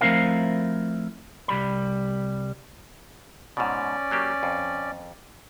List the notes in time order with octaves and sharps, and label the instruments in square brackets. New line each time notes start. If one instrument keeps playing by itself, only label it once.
[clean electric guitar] F3 A3 C4 E4 A#4 F5
C2 G3 B5
[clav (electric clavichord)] G#2 B2 [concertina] C#4 D5
[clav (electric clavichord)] F#3 A#3 G4
F2